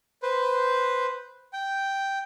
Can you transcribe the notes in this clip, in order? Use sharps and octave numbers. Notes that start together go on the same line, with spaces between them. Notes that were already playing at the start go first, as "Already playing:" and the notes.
B4 C5
G5